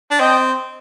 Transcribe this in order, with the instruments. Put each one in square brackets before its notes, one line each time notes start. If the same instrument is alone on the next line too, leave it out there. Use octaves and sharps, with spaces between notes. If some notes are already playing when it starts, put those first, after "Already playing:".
[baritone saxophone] D4
[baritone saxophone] C4 [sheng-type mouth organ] D#5 G5